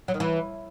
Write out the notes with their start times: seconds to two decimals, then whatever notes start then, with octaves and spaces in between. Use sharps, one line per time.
0.08 F#3
0.14 D#3
0.20 E3